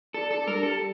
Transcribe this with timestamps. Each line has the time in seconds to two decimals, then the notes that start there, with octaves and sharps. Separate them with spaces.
0.14 D4 A4
0.31 A4
0.47 G3 A#4
0.63 A4